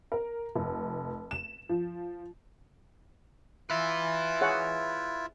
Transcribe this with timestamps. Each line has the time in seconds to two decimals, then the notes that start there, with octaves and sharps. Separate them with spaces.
0.12 A#4
0.56 F1
1.31 E7
1.69 F3
3.70 E4 F4 B4 E5
4.41 G#4 C#5 F#5